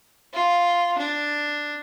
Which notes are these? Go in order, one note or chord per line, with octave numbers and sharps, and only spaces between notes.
F4
D4